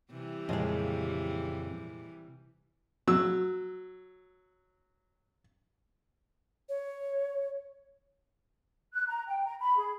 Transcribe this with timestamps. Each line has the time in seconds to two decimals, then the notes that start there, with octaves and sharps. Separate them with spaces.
0.11 C3 E3 G3
0.49 F2 A#2 C#3 G#3 D#5
3.08 F#3 E6
6.69 C#5
8.94 F#6
9.07 A#5
9.27 G5
9.46 A#5
9.60 B5
9.77 G#4